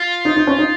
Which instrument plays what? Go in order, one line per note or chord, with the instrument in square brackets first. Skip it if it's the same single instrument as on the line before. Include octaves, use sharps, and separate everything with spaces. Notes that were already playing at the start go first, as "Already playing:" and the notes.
Already playing: [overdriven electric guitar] F4
[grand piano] D#4
D#4
C#4
D#4